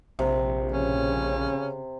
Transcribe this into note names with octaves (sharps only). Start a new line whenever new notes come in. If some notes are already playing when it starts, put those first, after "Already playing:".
A#1 C3
C#3 C#4